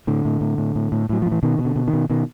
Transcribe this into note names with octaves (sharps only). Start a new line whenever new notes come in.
A2 D3
A2
A2
A2
A2
A2
A2 F#3
A2 F3
E3
B2 D#3
B2
D3
B2
D#3
B2
B2 D#3